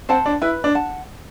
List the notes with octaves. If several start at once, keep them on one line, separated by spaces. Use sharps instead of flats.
C4 C5 F#5 A5
D4
E4 B4
D4
F#5 A5